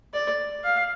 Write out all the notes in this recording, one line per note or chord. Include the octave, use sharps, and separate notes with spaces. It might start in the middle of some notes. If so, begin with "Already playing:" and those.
D5
F5